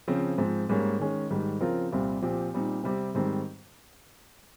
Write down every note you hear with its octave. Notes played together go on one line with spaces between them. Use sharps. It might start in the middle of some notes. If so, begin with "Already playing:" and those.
C#3 F3 C4
G#2 F3 C4
G#2 G3 A#3 C#4
D#3 G#3 C#4
G#2 D#3 G3
C#3 F3 C4 F4 A#4
C2 A#2 G3 C4 F4
A#2 F3 C4 G4
A#2 G3 C4 D#4
C3 G3 C4 G4
G#2 D#3 G3 C4